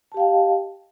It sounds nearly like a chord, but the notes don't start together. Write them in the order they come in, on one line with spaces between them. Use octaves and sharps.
A5 G4 F5 G5 D#5